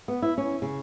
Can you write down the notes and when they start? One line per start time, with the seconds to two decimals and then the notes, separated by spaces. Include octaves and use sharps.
0.08 B3
0.22 E4
0.38 C#4
0.62 C#3